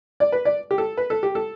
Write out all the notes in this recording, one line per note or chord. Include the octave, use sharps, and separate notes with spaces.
D5
B4
D5
G4
A4
B4
A4
G4
A4